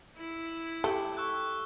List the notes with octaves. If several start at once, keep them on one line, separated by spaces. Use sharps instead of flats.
E4
A3 G4 A4
C#6 E6 F#6